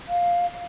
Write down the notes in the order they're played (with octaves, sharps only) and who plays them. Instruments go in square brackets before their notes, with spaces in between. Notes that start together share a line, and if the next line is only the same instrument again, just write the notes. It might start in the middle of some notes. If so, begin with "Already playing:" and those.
[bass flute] F5